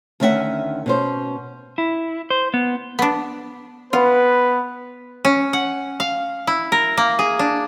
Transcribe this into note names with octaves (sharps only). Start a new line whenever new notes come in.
D2 D#3 C#4 D#4 E5 F#5
B2 C#4 C5
E4
C5
B3
B3 D4
B3 F4 B4
C#4
F#5
F5
E4
A#4
A#3
G#4
D4